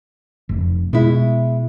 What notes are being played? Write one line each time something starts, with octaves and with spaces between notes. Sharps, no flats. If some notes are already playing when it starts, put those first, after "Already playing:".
F1
B2 G#3 E4